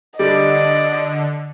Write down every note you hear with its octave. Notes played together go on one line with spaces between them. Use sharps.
D3 G3 D5 D#5